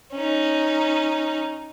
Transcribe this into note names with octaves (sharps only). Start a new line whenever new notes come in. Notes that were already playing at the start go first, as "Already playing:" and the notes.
C#4 D#4